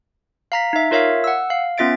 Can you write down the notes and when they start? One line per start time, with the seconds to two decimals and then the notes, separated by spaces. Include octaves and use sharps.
0.52 F5 A#5 B6
0.73 D#4 E5
0.91 F4 A#4 C#5 E5 F5
1.24 F#5 E6
1.50 F5
1.78 B3 C#4 F4 E5 A6 D7